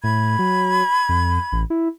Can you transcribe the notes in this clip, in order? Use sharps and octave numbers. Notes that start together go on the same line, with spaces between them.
A2 B5 G#6
F#3
F2
A1
E4